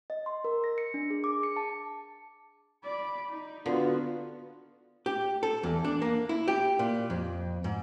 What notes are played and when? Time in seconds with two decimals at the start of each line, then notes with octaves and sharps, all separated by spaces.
0.10 D#5
0.26 C6
0.44 A#4
0.64 A#6
0.78 C#7
0.94 D4
1.10 G#4
1.24 D6
1.43 C#7
1.56 A5
2.83 D5 B5
3.30 D#4
3.66 D3 B3 F4 F#4
5.06 G4
5.43 A4
5.63 E2
5.85 D4
6.02 A#3
6.29 E4
6.48 G4
6.79 A#2
7.10 F2
7.64 G#2